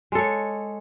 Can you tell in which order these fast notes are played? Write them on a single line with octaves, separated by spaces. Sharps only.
G#3 A4 C#5